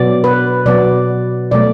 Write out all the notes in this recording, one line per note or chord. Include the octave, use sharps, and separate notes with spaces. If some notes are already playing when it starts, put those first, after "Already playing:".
Already playing: B2 F#3 B3 D5
B4
B2 F#3 B3 D5
B2 F#3 A3 D5